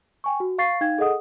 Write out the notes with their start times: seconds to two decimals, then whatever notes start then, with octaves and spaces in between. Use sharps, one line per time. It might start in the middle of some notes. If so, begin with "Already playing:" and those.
0.24 G5 G#5 C#6
0.40 F#4
0.58 F5 C#6 A6 C7
0.81 D#4 F5 G5 G#6
0.98 G#4 A4 D#5 F#5 D#6